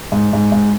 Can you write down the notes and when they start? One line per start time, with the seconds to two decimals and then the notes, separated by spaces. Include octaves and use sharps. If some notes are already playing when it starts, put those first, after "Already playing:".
0.12 G#2
0.33 G#2
0.52 G#2